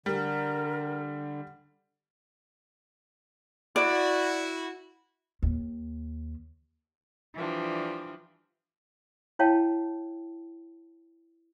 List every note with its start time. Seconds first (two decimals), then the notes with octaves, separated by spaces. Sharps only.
0.06 D3 G3 A#4
3.76 E4 F#4 D5
5.43 D#2
7.35 E3 F3 G3 D4
9.39 E4 C#5 F5 G5 A5